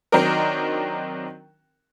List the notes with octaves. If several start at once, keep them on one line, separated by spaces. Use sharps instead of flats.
D#3 F#3 C4 D4 D#4 A#4